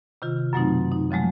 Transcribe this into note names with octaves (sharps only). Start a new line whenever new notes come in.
C3 D#3 F4
F#2 B2 F#3 A3 C4 D#4
D#4
C#3 F3 F#3 G#3 A3